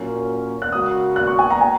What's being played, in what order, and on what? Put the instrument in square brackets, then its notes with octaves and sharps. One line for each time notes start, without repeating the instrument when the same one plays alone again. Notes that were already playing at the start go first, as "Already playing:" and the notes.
Already playing: [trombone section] A#2 F#3 C#4 A#4
[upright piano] F#6
[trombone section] C#3 G#3 F#4 A#4 [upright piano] D#6
[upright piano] F#6
C#6
G#5
A#5
G#5